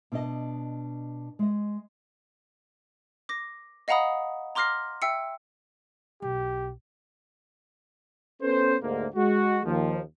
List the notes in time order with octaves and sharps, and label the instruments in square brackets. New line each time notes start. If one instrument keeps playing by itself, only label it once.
[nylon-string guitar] B2 D4 D#5
G#3 D#5
[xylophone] D6 A#6
D#5 F5 F#5 A#5 B5 D#6
A#5 C6 D6 F6 A#6 C7
E5 G5 E6 C7 C#7
[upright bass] B1 [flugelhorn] G4
[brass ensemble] B3 C#4 A4 B4 C5
D2 G#2 A#3
G#3 F#4
D#2 F3